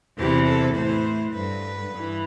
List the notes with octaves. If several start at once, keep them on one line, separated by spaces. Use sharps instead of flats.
E2 C3 E3 G4
A4
A2 E3 C5
G2 D3 B4
G2 E3